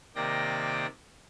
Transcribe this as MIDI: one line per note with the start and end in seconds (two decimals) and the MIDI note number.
0.15 0.86 48
0.15 0.86 51
0.15 0.86 58
0.15 0.86 74
0.15 0.86 79
0.15 0.86 94